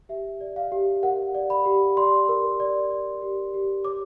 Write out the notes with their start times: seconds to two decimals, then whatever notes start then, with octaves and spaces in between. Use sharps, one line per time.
0.09 G4 E5
0.41 D5
0.56 F5
0.72 G4
1.03 A#4 F#5
1.35 D5
1.50 B5
1.66 G4
1.97 D5 C6
2.29 A#4
2.60 D5
2.91 D5
3.22 G4
3.54 G4
3.85 C#5 D6